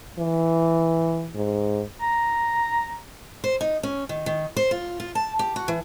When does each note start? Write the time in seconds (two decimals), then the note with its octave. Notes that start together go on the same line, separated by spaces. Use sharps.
0.19 E3
1.35 G#2
2.01 A#5
3.44 C5
3.61 D#4
3.83 C#4
4.09 D#3
4.26 D#3
4.56 C5
4.71 F4
5.00 F4
5.15 A5
5.39 G4
5.56 F#4
5.68 E3